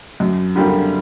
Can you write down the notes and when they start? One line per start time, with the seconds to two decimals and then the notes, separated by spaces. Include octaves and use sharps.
0.20 F#2
0.56 D3 G3 A#3